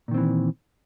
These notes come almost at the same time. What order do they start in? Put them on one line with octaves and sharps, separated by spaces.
A#2 D#3 C4 E3